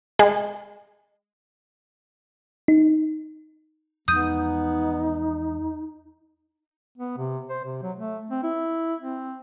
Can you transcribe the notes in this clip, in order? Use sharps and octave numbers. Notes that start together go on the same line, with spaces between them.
G#3
D#4
E2 F3 G#3 B3 D#4 D#6 G6 D#7
B3
C3
C5
C3
F#3
A3
C4
E4
C4